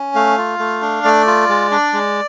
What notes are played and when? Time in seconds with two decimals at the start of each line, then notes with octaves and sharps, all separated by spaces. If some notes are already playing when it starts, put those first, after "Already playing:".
Already playing: C#4
0.14 A3 F5
0.38 F4
0.59 A3
0.82 D4
1.04 A3 D5
1.27 F4
1.49 G#3
1.71 D4
1.93 G#3